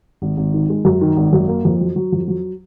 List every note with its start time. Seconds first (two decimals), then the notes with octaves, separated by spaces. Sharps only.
0.22 G#1
0.37 G#1
0.54 D#3
0.69 G#3
0.85 F#2
1.01 D#3
1.17 G#1
1.33 F#2
1.48 A#3
1.65 F2
1.81 F#3
1.96 F#3
2.12 F2
2.28 F#3